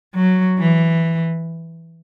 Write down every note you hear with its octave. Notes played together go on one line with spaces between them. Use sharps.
F#3
E3